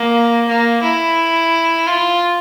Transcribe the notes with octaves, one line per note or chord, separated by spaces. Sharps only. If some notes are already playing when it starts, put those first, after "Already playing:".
Already playing: A#3
A#3
E4
F4